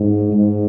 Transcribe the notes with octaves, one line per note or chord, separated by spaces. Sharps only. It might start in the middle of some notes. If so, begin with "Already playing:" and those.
Already playing: G#2
G#2